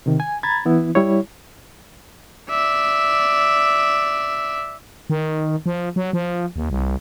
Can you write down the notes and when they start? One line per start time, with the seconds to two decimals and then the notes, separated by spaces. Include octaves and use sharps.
0.06 C3 D#3
0.20 G#5
0.43 A#5 B5 G#6 A6
0.65 E3 B3 E4
0.95 G3 E4 C#5
2.50 D5 E5
5.10 D#3
5.66 F3
5.96 F#3
6.13 F3
6.56 D#2
6.70 C2